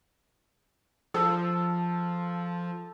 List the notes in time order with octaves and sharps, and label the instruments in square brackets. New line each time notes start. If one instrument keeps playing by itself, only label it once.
[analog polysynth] F3 [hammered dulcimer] A4